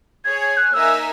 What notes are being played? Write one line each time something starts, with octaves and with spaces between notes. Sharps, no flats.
G#4 C#5 G#5 G#6
G#6
F#6
A#3 D#4 A#4 E5 G#5 E6